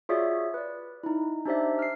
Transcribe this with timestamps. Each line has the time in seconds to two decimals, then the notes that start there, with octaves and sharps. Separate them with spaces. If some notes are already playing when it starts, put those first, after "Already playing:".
0.09 F4 F#4 G#4 C#5 D5 E5
0.54 B4 D5
1.03 D#4 E4
1.45 D4 D#4 G4 C5 D5 E5
1.79 F6 C7